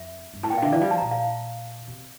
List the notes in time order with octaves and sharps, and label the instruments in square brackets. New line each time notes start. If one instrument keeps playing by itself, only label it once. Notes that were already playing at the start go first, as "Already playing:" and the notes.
Already playing: [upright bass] F2 [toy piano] E5
[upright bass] G2
[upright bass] A2 [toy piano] A5
[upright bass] A#2 [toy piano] G5
[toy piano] F5
[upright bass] D3 [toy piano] E5
[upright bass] E3 [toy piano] D5
[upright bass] G3 [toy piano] F5
[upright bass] F3 [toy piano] A5
[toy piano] A#5
[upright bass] A#2 [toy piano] A5
[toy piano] F5
[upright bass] C3